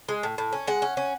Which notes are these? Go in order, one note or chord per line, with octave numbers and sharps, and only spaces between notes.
G#3
A2
A2
C#4
G#3 F#5
C#4
C#4